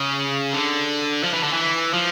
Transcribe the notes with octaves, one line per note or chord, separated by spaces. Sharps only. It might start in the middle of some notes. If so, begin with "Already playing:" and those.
Already playing: C#3
D3
F3
E3
D3
E3
F3